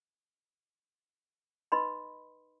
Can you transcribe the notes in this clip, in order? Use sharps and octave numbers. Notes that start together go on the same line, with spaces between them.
D#4 B4 D#5 B5 C6